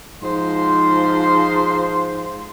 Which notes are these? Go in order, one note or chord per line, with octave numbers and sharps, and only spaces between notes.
G#2 F3 C5 C6